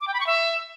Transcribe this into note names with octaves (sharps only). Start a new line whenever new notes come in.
D6
G5
B5
C#6
E5